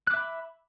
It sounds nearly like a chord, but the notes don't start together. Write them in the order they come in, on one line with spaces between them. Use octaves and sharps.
F#6 D6 E5 B5